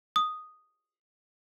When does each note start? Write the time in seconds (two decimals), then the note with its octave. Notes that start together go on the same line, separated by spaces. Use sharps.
0.16 D#6